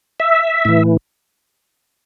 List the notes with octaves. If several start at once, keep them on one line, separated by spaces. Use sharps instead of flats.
E5
A2 E3